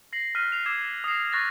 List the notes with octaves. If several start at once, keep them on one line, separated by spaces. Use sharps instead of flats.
A#6 C7 F#7
F6 F#6 B6 D#7
C7 F7
D6 E6 G#6 C7 E7
D#6 F#6 A#6 C7
C#6 F#6 A6 A#6